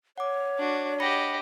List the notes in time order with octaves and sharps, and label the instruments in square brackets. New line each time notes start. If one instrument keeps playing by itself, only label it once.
[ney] C#5 [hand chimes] F#5 D6
[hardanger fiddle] D4 F#4
[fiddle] G4 D#5 [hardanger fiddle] F#5 [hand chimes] B5 A#6 C#7